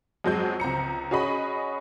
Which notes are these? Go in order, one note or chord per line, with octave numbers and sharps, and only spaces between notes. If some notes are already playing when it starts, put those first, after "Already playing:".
F2 F#3 G#3 G6
C#2 C4 A#5 C#7
C#4 F#4 G#4 D#5 B5